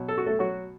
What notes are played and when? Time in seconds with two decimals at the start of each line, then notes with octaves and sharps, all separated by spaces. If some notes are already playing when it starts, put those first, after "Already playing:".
Already playing: B2 F#3
0.08 A4
0.18 F#4
0.26 A3 A4
0.39 F#3 F#4